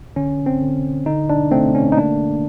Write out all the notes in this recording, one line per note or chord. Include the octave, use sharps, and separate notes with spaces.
D3 C#4
C4
D3
D3 D#4
D4
A3 C4
C#4
D#4
A#3 D4